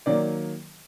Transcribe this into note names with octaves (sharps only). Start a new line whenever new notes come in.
D#3 F#3 A#3 D5